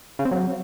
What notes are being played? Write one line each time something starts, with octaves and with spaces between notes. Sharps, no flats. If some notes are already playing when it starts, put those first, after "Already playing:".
C#3
C4
F#3